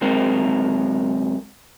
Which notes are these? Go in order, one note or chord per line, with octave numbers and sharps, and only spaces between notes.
F#2 G#3 C4 A#4